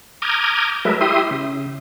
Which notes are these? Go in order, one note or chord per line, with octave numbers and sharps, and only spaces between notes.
A#5 D6 D#6 F6 G6 G#6
F#3 G#3 A3 A#4 B4 E5
E4 G4 E5 C6 D#6
C#3